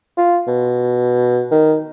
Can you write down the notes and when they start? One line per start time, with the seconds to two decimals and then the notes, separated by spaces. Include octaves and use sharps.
0.18 F4
0.47 B2
1.51 D#3